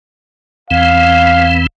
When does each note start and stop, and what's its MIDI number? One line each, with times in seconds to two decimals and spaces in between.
0.71 1.67 40
0.71 1.67 52
0.71 1.67 60
0.71 1.61 77